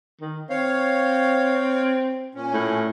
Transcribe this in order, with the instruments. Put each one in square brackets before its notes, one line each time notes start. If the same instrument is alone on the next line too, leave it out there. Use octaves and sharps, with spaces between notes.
[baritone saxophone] D#3
[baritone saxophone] C4 [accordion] C#5 F5
[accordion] A#2 C#4
[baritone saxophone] A2